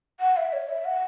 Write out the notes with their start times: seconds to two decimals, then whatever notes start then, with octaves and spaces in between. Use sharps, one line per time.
0.20 F#5
0.37 E5
0.53 C#5
0.69 E5
0.85 F#5